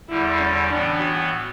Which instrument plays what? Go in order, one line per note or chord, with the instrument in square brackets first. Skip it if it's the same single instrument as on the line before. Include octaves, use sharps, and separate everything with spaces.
[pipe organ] E2 D3 G3 [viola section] E4
[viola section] C#4
[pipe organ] A2 E3 B3 [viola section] D4
[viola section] F#4